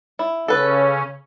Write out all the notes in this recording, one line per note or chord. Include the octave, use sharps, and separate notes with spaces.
E4
C#3 C#4 A4 B4